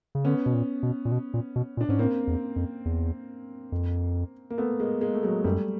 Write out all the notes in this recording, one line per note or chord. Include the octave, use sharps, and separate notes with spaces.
C#3
D3 B3 C#4
B2
A#2
B2
A#2
B2
A#2
B2
A#2
D4
G#2 C#4
A2 A#3 C4
E2
F2
E2
F2
A#3
A3 B3
G#3 A#3
G#3 A#3
A3
F#3 G#3
F#2 G3 A3